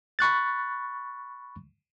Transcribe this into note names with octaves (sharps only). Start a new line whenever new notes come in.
B5 C#6 F#6 A6